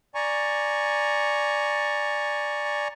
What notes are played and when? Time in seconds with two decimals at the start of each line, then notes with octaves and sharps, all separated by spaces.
0.15 D5 G#5 A#5 C#6